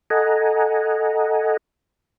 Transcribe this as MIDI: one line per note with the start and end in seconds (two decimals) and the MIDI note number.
0.10 1.57 69
0.10 1.57 75
0.10 1.57 78
0.10 1.57 80
0.10 1.57 82